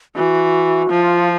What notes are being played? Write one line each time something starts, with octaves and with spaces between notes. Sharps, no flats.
E3 F#4
F3 F4